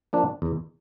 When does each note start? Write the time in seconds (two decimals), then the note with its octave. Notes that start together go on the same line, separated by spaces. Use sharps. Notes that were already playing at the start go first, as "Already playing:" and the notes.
0.13 F3 A#3 D4
0.42 E2